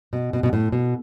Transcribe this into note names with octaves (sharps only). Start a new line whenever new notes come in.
B2
B2
B2
A2
B2